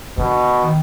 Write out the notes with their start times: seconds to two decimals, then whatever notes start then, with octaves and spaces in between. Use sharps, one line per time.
0.18 B2 D3
0.62 D#3